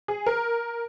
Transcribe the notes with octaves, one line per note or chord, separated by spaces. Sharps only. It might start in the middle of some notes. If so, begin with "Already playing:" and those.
G#4
A#4